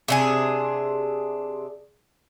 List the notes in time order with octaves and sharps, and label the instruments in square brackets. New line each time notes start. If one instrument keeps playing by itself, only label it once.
[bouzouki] C3 D4 G#4